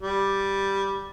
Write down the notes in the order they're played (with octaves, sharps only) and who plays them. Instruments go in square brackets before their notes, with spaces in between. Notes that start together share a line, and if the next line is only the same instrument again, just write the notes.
[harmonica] G3